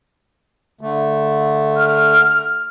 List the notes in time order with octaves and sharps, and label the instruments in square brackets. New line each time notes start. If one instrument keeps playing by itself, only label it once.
[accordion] D3 A3
[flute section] F6